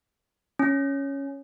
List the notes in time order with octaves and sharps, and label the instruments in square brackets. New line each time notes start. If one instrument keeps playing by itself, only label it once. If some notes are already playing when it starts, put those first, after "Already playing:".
[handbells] C#4